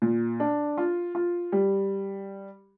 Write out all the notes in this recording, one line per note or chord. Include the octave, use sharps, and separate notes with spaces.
A#2
D4
F4
F4
G3